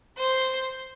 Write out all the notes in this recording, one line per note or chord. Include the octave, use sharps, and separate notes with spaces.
C5